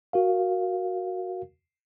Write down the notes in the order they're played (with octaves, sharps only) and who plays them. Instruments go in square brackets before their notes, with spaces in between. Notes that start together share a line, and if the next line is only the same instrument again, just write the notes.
[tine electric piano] F#4 A#4 F5